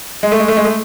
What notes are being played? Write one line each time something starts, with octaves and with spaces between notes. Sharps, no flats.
G#3
A3
G#3
A3
G#3
A3